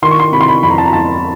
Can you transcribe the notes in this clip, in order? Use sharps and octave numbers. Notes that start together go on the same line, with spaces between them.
D#3 C6
C#6
C6
C3 B5
C6
B5
F2 B5
A#5
A5
A#5
F2 A5